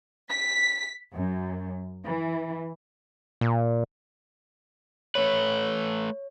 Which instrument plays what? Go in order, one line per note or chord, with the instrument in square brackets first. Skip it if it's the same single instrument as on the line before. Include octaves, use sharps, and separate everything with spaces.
[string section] B6
F#2
E3
[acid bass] A#2
[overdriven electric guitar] A3 B4 [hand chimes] C#5